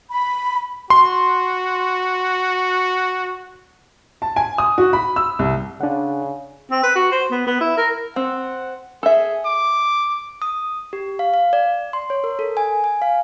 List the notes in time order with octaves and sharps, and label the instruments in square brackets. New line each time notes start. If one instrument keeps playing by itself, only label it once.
[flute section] B5
[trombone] F#4 [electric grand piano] C6
[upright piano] A5
G#5
D#6
F#4
B5
E6
C2
[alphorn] C#3 [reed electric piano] D4 F#5
[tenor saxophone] C4
B4
F#4
C5
B3
B3
E4
A#4
[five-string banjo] C4 [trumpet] F#5
[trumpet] G#4 [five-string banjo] A4 E5
[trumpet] D6
[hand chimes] D#6
G4
F5
F5
D5
C6
C#5
A#4
A4
G#5
G#5
F5